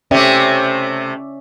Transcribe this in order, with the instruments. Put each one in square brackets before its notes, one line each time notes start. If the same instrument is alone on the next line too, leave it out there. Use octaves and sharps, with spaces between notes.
[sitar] C3 A3 [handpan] C#4 D5 E5